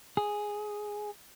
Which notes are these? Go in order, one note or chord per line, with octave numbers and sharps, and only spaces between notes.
G#4